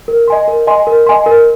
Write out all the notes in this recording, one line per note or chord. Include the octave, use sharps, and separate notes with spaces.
A#4
D#5 G#5 C6
A#4
D#5 G#5 C6
A#4
D#5 G#5 C6
A#4